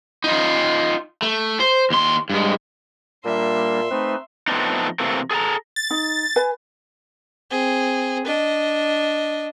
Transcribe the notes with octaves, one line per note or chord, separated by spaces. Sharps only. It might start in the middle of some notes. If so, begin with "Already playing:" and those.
D#4 F4
A3
C5
D#2 C6
G2 G#3
A#2 G3 A#3 D4 E5 C6
A3 C4 D#4 B4
F3 A3 B3 C4 D4 D#4
C3 E3 A3 A#3 C4
G#4 A4 G#5 A#5
A6
D#4
B4 G#5
C4 G#4
D4 D#5